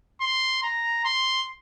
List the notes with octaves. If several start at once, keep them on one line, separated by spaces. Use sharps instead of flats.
C6
A#5
C6